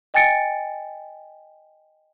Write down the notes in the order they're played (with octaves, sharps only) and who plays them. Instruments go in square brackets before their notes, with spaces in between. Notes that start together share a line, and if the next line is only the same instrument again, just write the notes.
[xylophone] D#5 G5 G#5 A6 C#7 D7